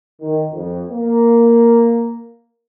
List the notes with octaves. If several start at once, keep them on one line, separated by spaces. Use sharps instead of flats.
D#3
F2
A#3